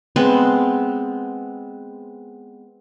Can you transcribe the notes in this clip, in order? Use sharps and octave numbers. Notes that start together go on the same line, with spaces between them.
G#3 B3 C4